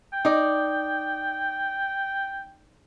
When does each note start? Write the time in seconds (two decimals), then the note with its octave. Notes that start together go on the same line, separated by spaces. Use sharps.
0.13 G5
0.25 D#4 D5